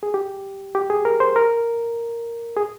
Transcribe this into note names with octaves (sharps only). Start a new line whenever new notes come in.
G#4
G4
G4
G#4
A#4
C5
A#4
G#4